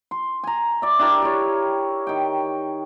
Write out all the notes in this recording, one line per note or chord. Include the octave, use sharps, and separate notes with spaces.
C6
G#5 A#5
D5 E5
D4 E4 G4 A#4
G4 C#5
D#3 G5